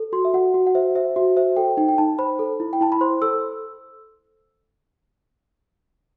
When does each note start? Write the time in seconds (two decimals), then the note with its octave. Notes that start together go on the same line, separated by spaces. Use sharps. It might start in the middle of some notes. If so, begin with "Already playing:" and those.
Already playing: A4
0.13 F#4 C6
0.25 E5
0.34 F#4 F#5
0.54 F#4
0.67 F#5
0.75 C5 E5
0.95 C5 E5
1.16 F#4 E5
1.37 C5 E5
1.56 A4 G5
1.77 D#4 G5
1.89 G5
1.98 D#4 A5
2.19 C5 B5
2.39 A4
2.60 E4
2.73 G5
2.81 E4 A5
2.92 B5
3.01 C5 C6
3.22 A4 E6